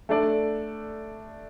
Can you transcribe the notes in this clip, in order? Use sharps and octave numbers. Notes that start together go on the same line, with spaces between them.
A3 D4 A4 D5